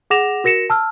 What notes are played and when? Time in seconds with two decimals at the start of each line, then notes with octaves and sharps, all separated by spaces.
0.10 G#4 F#5 D6 A#6 E7 F7
0.44 F#4 A#4 A#6 C#7 E7
0.70 A5 E6 F6